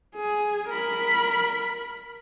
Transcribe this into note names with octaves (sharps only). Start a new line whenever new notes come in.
G#4
A#4 B5